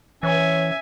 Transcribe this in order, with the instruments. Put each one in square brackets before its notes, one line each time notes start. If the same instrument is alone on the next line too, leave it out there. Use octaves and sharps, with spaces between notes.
[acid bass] E3 [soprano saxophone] C#4 [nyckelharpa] E5 G#5